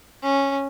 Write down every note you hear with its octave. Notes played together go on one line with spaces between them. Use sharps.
C#4